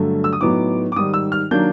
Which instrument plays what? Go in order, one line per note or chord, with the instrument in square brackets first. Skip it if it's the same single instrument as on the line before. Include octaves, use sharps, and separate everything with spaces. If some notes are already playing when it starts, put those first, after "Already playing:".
Already playing: [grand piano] G2 D3 F#3 A3
E6
D#6
A2 F#3 B3 D#4 D6
D6
G#2 D#3 G3 D#6
E6
F6
D#3 F#3 A#3 D4 G6